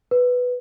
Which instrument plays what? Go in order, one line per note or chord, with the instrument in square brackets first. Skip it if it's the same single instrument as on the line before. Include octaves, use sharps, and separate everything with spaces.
[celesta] B4